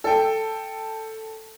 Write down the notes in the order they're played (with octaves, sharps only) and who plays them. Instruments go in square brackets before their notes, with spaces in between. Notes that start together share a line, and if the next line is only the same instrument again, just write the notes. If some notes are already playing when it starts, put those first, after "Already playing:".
[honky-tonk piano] A4 G5